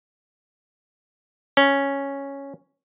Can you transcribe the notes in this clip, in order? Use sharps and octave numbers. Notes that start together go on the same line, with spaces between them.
C#4